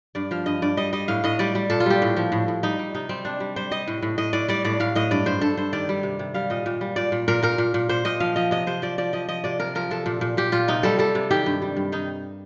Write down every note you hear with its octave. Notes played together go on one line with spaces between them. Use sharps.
G2 D5
F3 F5
G2 D#5
G2 D5
G3 D#5
G3 D#5
A2 F5
A2 D#5
G3 D5
G3
A#2 A4
F4
G3 G4
A2
F3
A2
A2
G3 D#4
G3
C3 D#4
G3 C4
C3 D4
G3
G3 C5
G3 D#5
A2
A2
A2 D#5
A2 D5
G3 D5
A2 D5
A2 F5
A2 D#5
G2 D5
G2 C5
G2 A4
G2 C5
D#3 D5
G3
C3
C3
G3 F5
A#2 D#5
A#2
G3
A#2 D5
A#2
A#2 A#4
A#2 A#4
A#2
A#2
A#2 C5
A#2 D#5
F3 F5
F3 D#5
C3 D#5
C3 C5
F3 D5
F3 D5
F3 D#5
F3 D#5
C3 D5
C3 A#4
F3 A#4
C3 A4
A#2
A#2
A#2 G4
A#2 F4
C3 D#4
G3 A4
G3 A4
C3
D#3 G4
G2
G3
G2
D#3 D#4